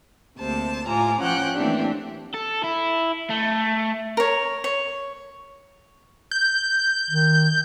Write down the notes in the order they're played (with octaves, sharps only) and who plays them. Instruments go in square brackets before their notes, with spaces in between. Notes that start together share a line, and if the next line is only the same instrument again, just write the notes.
[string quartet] D2 C3 A#3 C5 A5
A2 F4 G#5 A#5 D6
F3 C#4 F#5 G5 F#6
E3 A3 A#3 C4 D4 G4
[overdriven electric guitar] A4
E4
A3
[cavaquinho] A#4 C#5
C#5
[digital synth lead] G6
[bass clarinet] D#3